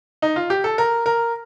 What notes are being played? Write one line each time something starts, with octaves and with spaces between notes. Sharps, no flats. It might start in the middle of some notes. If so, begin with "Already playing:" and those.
D#4
F4
G4
A4
A#4
A#4